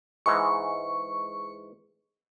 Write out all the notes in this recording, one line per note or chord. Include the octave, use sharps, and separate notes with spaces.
G#2 E3 G#3 C#6